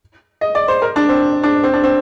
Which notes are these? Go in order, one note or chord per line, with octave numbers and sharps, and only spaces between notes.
D#5
D5
C5
A#4
D4
C4
D4
C4
D4
C4